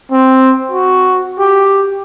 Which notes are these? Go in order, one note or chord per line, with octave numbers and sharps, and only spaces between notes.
C4
F#4
G4